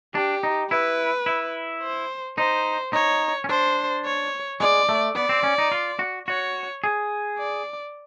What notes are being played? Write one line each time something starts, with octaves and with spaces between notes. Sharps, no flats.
D4 G4
D#4
E4 B4
E4
C5
D#4 C5
D#4 C#5
C#4
D4 C5
C#5
G#3 D5
A3
B3 D5
C4
C#4
D#4
F4
F#4
F#4 C#5
G#4
D5